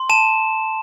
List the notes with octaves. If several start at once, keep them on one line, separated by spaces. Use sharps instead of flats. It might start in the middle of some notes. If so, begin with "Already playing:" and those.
Already playing: C6
A5 E7